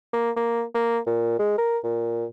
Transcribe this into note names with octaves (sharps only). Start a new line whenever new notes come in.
A#3
A#3
A#3
A#2
G#3
A#4
A#2